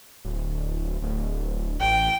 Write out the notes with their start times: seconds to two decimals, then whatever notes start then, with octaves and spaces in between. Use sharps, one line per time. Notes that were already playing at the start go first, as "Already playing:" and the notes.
0.25 D1
1.02 D1
1.80 A1 G5